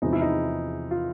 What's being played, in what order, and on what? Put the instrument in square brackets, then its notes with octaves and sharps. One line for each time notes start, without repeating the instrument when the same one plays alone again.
[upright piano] E2 C3 F3 G#3 D#4
E4
D#4
F4